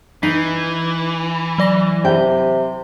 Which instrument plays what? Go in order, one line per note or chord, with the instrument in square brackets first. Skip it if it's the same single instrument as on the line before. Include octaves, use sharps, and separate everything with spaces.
[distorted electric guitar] E3 [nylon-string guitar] D#4 [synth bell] B6 C7
[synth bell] F#3 D5 A#6
[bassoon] C3 [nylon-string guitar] G5